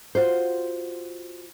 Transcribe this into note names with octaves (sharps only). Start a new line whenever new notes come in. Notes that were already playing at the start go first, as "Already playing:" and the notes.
F4 F#4 C5